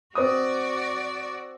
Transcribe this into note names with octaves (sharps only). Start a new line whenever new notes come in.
C4 F#4 D5 D#6